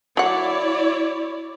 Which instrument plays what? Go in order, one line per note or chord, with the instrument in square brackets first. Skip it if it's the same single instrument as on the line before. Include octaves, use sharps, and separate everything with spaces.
[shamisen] F#3 F#5 [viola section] E4 C#5 D5